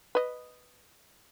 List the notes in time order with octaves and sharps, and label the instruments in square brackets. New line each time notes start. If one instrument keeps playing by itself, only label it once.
[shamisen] B4 D#5